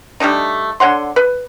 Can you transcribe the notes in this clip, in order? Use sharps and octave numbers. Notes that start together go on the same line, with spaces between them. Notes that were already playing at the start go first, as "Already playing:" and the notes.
G3 A3 D4 D#4
D3 C#5 F#5 C6
B4